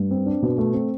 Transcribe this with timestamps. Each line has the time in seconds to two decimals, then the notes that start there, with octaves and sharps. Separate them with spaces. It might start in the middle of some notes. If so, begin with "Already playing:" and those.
Already playing: G2
0.11 C4
0.26 D4
0.43 B2
0.58 A3
0.73 C4